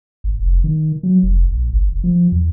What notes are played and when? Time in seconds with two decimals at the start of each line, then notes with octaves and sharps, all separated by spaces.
0.24 G#1
0.39 F1
0.64 D#3
1.03 F#3
1.23 F1
1.51 A#1
1.73 G1
1.92 F1
2.04 F3
2.32 E2